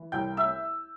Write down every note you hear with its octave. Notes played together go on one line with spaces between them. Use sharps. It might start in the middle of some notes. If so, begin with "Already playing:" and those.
Already playing: E3
C2 G5 G6
E5 E6